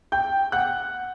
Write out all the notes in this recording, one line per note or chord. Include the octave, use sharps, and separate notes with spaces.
G5 G6
F#5 F#6